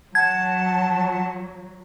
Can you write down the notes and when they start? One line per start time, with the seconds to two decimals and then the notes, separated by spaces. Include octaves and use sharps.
0.15 F#3 F#5 A5 G#6